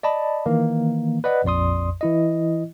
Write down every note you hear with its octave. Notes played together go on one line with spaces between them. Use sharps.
D5 D#5 A5 B5
D#3 E3 A#3
B4 D5 D#5 F#5
A#1 F2 D5 C6 D#6
E3 E4 D#5